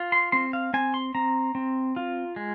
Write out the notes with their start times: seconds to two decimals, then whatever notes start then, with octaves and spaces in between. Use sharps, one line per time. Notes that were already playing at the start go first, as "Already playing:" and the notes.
Already playing: F4
0.12 C6
0.32 C4 C6
0.53 F5
0.74 C4 G#5
0.94 C6
1.15 C4 A#5
1.55 C4
1.96 F4
2.36 G#3